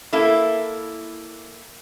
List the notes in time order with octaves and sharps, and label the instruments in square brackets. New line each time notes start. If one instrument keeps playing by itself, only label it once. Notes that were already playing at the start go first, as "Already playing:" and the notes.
[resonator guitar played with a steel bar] A#3 E4 A4